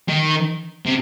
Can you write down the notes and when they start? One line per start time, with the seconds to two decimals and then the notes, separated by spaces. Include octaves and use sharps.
0.09 D#3
0.86 C3